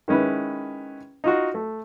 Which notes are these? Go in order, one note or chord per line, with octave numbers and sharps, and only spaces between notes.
D#3 G#3 C#4 E4 B4
D#4 F4 F#4
A3